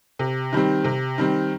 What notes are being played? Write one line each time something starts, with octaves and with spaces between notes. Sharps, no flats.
C3
D#3 G3 C4
C3
D#3 G3 C4